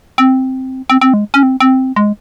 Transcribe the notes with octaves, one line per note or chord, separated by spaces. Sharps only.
C4
C4
C4
G#3
C#4
C4
C4
G#3